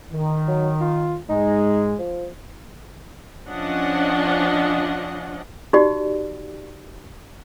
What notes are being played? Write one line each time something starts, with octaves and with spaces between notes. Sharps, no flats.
D#3
F#3
F4
G#2 G#3 D#4
F3
F3 C#4 D4 D#5 F#5
D#4 F#4 G4 D5